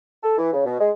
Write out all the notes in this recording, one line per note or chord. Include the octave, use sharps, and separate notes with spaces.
A4
E3
C#3
B2
G#3